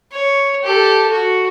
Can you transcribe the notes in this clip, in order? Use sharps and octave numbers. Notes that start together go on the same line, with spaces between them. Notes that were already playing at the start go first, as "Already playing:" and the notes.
C#5
G4 A4
F#4